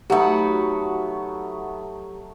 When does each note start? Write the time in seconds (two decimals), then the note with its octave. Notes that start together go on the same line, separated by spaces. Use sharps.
0.10 F#3 A3 B3 D#4 F#4 G4